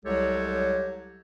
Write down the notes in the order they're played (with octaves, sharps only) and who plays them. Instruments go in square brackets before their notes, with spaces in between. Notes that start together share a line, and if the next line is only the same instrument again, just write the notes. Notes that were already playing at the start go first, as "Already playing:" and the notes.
[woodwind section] C2 F#3 G#3 G4 A4 C#5